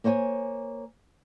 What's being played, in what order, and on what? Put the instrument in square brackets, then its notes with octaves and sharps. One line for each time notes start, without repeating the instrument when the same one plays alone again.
[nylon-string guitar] A#3 C5 C#5 F#5 G#5